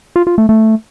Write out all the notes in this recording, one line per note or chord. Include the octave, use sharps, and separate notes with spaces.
F4
F4
A3
A3